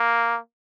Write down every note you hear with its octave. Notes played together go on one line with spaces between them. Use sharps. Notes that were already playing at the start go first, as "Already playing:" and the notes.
Already playing: A#3